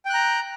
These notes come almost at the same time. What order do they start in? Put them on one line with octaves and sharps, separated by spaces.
G5 F#6 A#5